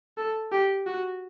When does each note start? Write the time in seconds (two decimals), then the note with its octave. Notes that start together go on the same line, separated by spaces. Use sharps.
0.17 A4
0.52 G4
0.86 F#4